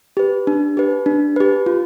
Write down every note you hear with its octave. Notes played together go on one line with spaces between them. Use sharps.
G4 B4
D4
G4 B4
D4
G4 B4
F4